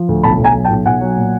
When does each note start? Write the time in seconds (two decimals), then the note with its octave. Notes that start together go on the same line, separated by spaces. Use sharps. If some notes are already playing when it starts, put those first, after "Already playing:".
Already playing: F3
0.09 D2
0.23 B1 A5 B5
0.39 B1
0.44 G#5 A#5
0.54 F#3
0.64 G5 A5
0.70 B1
0.86 B1 F#5 G#5
1.01 F#3
1.17 A#2